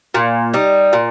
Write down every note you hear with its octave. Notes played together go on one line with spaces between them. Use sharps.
A#2
G3 D#4
A#2